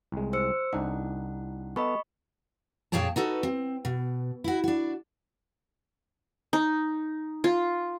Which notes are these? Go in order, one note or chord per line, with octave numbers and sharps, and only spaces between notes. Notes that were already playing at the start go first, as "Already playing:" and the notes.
C2 G#3
C5 E6 C#7
C2 D4 D#4 F#5
B3 A4 B4 D#5 B5 C#6
F2 A#2 G#4 C#5 G5 A5
D#4 F#4 A4 B4
C4
B2
E4 F#4
D4 F#4
D#4
F4